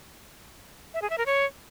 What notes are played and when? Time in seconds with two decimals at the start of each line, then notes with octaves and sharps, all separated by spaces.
0.94 E5
1.02 G#4
1.10 E5
1.18 A#4
1.26 C#5